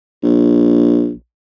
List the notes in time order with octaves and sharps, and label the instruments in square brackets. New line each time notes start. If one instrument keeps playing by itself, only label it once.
[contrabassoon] A#1